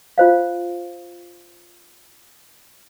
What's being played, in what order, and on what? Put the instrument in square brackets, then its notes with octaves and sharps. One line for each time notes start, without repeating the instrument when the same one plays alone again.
[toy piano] F4 C5 F5